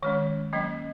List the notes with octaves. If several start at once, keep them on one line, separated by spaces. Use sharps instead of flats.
D#3 G#3 C#4 C#5
F#3 A#3 C#4 D#5